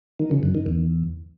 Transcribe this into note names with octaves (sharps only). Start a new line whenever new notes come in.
D#3
C#3
F#2
D#3
E2